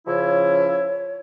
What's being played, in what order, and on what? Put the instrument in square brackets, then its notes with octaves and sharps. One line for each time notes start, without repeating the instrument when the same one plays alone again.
[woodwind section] C#3 F3 E4 [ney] C#5